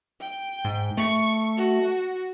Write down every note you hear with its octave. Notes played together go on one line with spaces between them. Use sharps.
G5
G#2
A3 C#6
F#4